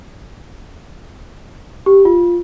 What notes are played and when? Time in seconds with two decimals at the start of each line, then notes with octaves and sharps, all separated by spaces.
1.86 G4
2.05 F4